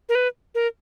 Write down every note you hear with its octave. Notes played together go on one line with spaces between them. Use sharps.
A#4
B4
A#4